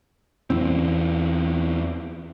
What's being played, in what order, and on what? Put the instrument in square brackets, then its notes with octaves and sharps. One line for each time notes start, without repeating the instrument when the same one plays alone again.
[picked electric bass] E2 E3 C4